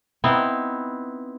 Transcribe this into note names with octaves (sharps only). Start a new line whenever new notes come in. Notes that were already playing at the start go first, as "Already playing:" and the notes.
B3 C4 D#4 E4